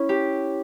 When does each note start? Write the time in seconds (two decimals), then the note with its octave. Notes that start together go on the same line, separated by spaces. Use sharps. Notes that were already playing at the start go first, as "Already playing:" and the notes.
Already playing: C#4 E4
0.09 G4